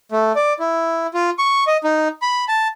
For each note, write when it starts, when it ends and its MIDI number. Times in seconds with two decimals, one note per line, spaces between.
0.12 0.32 57
0.36 0.53 74
0.60 1.07 64
1.14 1.30 65
1.39 1.64 85
1.67 1.77 75
1.84 2.08 63
2.22 2.45 83
2.48 2.68 81